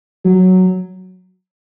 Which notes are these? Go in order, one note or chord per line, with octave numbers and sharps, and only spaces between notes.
F#3